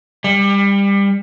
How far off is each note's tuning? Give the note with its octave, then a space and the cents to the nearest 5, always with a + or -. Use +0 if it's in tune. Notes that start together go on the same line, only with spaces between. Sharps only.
G3 +25